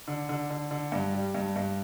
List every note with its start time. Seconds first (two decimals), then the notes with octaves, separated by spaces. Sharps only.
0.08 D3
0.29 D3
0.50 D3
0.71 D3
0.92 G2
1.13 G3
1.35 G2
1.56 G2